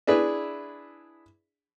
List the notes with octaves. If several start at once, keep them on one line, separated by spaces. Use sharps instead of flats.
D4 E4 G#4 B4